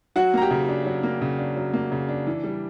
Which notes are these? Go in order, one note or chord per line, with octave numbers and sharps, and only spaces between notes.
F#3 F#4 F#5
A#3 A#5
G4 G5
C#3
D4
F#3
A#3
C#3
D4
F#3
A#3
C#3
D4
E3
G3